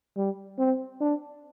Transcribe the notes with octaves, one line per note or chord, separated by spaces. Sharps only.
G3
C4
D4